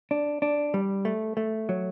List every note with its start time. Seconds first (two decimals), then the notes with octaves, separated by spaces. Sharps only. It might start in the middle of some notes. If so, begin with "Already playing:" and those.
0.11 D4
0.42 D4
0.74 G3
1.05 A3
1.37 A3
1.69 F#3